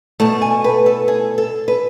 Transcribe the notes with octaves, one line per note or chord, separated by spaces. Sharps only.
B2 A3 A5
G#5
B4
A4
G#4
A4
B4